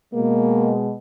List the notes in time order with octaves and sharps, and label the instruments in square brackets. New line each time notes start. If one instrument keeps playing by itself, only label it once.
[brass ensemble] B2 G#3 [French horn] A#3